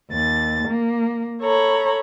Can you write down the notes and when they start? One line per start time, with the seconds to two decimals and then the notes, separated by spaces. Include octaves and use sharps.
0.11 D#2 A6
0.68 A#3
1.41 A4 C#5 A#5 B5